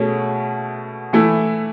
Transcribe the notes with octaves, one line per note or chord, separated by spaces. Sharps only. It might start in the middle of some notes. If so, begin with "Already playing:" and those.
Already playing: B2 A3 C#4 G#4
E3 A3 E4